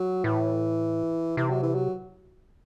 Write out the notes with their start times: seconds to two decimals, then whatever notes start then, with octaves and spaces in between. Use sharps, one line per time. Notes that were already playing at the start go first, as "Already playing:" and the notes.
Already playing: F#3
0.24 A2 E3
1.37 C3 E3
1.50 F#3
1.62 E3
1.75 F#3